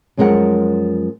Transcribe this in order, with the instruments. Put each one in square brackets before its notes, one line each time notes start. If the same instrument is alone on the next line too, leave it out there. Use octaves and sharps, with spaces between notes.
[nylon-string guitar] F#2 F3 G#3 D#4 A#4 F#5